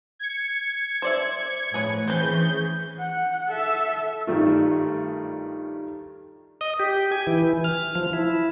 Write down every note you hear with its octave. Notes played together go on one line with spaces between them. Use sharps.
G#6 C#7
C5 D5 E5
A2 F3 G#4 B4 C#5
E3 C4 C#4 G#4 B4 G6
F#5
A4 E5
G2 D#3 G3 A3 F4
D#5
G4
G#5
E3
F6
F3
E4